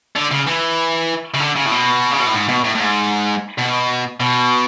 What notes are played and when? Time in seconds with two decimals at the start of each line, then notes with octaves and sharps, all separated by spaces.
0.16 D3
0.31 C#3
0.47 E3
1.34 C#3
1.40 D3
1.56 C#3
1.66 A2
1.71 B2
2.11 C#3
2.19 B2
2.27 A2
2.34 G#2
2.49 B2
2.64 A2
2.75 A2
2.80 G#2
3.58 B2
4.20 B2